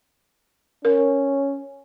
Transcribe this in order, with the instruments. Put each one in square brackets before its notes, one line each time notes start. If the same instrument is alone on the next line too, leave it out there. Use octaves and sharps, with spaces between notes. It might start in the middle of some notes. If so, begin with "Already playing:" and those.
[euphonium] C#4 [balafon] A#4